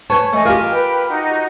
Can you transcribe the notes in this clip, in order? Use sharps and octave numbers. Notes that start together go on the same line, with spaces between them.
B4 C#5 G#5 A5
A3 D#5 G#5
F4 G4 A#4
B4 G5
D#4 F#4